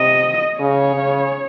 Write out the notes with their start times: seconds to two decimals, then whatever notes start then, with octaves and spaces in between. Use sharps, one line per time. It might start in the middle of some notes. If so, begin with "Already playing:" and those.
Already playing: C3 D#5
0.60 C#3 C#5
0.95 C#3